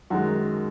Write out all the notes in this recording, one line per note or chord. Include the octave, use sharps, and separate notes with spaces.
F#2 D#3 G#3 F#4